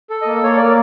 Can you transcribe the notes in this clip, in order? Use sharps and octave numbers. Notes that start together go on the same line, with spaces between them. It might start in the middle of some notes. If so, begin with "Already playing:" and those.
A4
D#5
A#3
A#3 C#5
A#3 D5